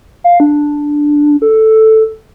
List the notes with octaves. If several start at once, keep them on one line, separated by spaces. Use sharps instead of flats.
F5
D4
A4